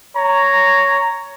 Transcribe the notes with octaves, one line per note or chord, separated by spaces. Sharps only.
C#5 A#5